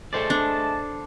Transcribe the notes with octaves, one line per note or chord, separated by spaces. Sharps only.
G#3 A3 A4 C5 D5 A5
D4